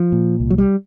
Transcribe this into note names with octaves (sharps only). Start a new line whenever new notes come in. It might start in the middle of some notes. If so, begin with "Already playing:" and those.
Already playing: F3
A#2
C2
F#3
G3